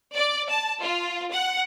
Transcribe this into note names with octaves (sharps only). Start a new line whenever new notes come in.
D5
A5
F4
F#5